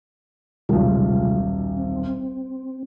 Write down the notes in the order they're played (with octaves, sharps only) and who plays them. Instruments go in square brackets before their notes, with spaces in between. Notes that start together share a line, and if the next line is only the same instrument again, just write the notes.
[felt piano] D#1 B1 [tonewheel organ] C3 G#3 F4
[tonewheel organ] C4